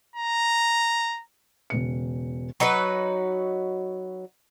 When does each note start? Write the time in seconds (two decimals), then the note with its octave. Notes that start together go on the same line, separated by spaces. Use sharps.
0.16 A#5
1.70 E1 C#3 C#7
2.60 F#3 D#4 F#4 B4